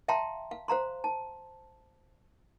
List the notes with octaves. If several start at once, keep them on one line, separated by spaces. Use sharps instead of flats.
E5 F5 G5 A5 A#5 C6
F5
C5 F5 A#5 C6
A5